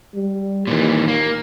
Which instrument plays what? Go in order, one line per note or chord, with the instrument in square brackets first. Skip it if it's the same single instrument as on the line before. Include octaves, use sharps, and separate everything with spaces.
[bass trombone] G3
[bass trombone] D#2 [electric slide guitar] A#2 E3
[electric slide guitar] A#3